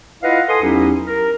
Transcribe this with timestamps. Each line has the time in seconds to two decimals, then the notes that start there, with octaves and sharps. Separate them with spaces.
0.22 E4 F4 B4 D#5 F5 F#5
0.48 A4 B4 F#5 G#5 C6 D#6
0.62 E2 F#3 C#4 D#4 E4 G4
1.07 A#4